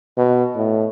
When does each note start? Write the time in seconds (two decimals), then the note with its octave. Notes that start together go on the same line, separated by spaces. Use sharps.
0.17 B2
0.56 A2